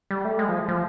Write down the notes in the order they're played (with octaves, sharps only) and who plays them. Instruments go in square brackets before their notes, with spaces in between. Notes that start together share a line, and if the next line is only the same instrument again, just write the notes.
[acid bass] G3
A3
G#3
F3
F3